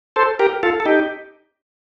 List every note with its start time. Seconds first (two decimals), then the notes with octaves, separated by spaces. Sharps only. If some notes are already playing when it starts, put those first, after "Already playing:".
0.16 A4 C5
0.39 G4 A#4
0.63 F4 A4
0.80 A4
0.86 D#4 G4